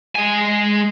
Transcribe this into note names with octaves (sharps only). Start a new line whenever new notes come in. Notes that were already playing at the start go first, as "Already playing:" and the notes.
G#3 G#5